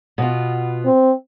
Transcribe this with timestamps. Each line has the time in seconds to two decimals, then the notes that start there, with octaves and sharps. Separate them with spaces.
0.18 B2 B3 F4
0.85 C4